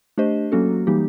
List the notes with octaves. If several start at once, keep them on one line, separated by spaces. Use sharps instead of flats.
A3 D4 G4 C5 D#5
F#3 A#3 C#4 F#4 A4
E3 G3 A#3 D#4 G4